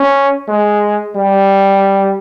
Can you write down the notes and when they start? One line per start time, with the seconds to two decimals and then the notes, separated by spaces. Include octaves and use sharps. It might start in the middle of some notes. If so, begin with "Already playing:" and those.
Already playing: C#4
0.48 G#3
1.16 G3